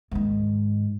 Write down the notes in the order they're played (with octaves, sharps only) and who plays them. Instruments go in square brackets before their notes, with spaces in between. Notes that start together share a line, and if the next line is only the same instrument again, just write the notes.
[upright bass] G#2 D#3